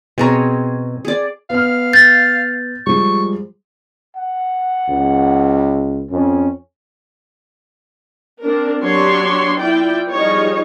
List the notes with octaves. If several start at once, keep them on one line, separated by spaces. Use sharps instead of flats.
B2 C4 G#4 C#5 A#5
G#4 D5
B3 F5 F6
G6 A6
F3 G3 G#3 C#6
F#5
C#2
F2 C#4
C4 D4 A#4
F#3 D4 G4 C#5 C6
E4 F4 D5 G5
F3 G3 D#4 G#4 C#5